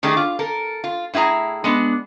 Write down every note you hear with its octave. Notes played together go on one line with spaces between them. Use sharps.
D#3 A3 D4 G4 G#4
F4
A4 A#4
F4
A2 E4 F4 G#4 A#5
G#3 B3 D4